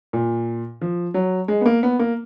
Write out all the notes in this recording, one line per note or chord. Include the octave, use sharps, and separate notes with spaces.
A#2
F3
F#3
G#3
B3
A#3
B3
A#3